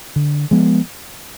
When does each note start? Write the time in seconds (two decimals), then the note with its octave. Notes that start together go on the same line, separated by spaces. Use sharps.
0.16 D3
0.51 F3 G#3 B3